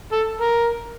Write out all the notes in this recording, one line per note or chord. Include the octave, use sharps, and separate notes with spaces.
A4
A#4